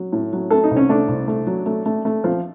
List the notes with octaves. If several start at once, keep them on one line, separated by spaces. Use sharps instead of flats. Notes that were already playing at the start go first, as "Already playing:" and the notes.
Already playing: F#3
A2
F#3
A3 A4
D#4
C2
C#4
A3 D4
C2
A3
F#3
A3
A3
A3
F3